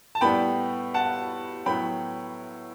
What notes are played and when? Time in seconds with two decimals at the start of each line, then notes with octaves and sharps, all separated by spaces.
0.15 A5
0.21 A2 G3 B3 G5 B5
0.94 F#5 A5
1.66 A2 F#3 B3 G5 B5